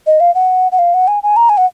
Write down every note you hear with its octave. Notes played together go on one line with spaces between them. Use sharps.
D#5
F5
F#5
F#5
F5
F#5
G#5
G#5
A#5
G#5
F#5